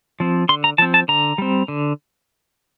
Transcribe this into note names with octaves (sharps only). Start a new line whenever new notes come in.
F3 C4
D3 C6
A#5
F3 C4 A5
A5
D3 A#5
G3 C4
D3